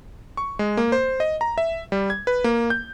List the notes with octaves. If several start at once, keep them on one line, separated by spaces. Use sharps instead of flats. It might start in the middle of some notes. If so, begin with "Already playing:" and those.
C#6
G#3
A#3
C5
D#5
A#5
E5
G3
G#6
B4
A#3
G6